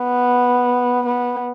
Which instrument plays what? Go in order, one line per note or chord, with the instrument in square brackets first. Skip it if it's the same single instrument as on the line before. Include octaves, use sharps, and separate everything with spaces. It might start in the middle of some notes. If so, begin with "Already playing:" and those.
Already playing: [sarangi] B3
B3